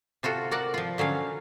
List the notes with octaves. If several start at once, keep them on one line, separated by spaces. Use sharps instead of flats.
C3 F4 F#4 A4
F#4 A#4 D5 F#5
F3 F4
D3 F#3 C#4 F5